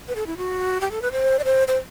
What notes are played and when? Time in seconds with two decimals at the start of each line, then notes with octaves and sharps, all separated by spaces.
0.08 B4
0.16 A4
0.27 E4
0.37 F#4
0.81 G4
0.91 A4
1.02 B4
1.12 C5
1.39 D5
1.45 C5
1.68 C5